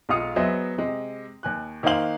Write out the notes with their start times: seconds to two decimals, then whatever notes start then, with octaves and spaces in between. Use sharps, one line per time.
0.09 B1 G#3 F4 F5 D#6 C#7
0.36 F#3 B3 G#4 C5 D#5 E5
0.78 C3 G#3
1.43 D#2 G#5 F#6
1.83 D#3 A#3 D#4 C5 F5 F#7